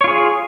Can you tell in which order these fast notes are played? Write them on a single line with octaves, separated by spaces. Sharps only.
C#5 F4 G#4